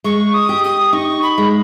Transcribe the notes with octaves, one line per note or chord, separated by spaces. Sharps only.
G#3 C#6
D#6
G4
D#6
D#4 C#6
B5
G#3